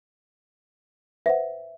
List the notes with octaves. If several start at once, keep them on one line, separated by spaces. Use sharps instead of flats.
B4 C5 E5 F#5